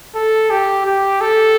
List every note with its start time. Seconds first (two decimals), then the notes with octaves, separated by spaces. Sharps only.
0.15 A4
0.50 G4
0.86 G4
1.21 A4